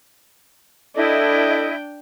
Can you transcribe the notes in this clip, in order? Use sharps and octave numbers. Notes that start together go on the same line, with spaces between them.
D4 E4 A4 D#5 G5